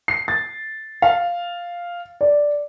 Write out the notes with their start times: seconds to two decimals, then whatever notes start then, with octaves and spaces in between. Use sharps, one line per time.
0.08 C7
0.28 A6
1.02 F5
2.21 D5